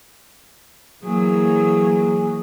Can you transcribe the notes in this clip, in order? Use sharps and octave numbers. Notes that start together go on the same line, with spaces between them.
E3 F#3 A#3 G#4